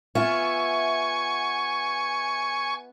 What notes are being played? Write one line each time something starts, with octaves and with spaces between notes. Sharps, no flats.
B3 F4 E5 G#5 C#6